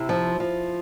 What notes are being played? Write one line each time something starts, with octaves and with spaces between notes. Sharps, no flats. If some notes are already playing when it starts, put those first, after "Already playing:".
Already playing: C3 E4
F3
F3